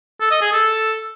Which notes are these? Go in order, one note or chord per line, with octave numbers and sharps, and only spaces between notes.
A4
D#5
G#4
A4